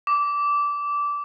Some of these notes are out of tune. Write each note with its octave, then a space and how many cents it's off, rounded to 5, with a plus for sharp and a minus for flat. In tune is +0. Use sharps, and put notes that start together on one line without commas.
D6 -15